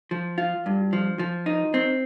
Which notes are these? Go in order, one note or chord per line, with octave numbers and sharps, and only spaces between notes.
F3
F4
G2
F3
F3
D#4
C4